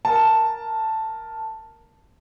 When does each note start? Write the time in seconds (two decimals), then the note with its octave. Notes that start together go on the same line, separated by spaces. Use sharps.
0.05 A#4 A5